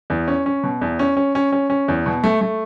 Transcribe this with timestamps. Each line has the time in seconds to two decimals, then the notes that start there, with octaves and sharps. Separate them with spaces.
0.10 E2
0.28 C#4
0.46 C#4
0.63 B2
0.81 E2
0.99 C#4
1.17 C#4
1.35 C#4
1.52 C#4
1.70 C#4
1.88 E2
2.06 B2
2.24 A3
2.41 A3